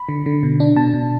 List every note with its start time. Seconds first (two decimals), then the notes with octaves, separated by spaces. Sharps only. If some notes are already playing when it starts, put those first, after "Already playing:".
Already playing: B5
0.09 D3
0.26 D3
0.43 B2
0.60 D4
0.76 B2 A5
0.94 B2